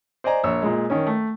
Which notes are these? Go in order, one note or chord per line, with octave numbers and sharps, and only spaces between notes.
C5 D5 D#5 G#5 A#5
A#1 C#5 E6
A#2 G#3
D#3 C#4
A3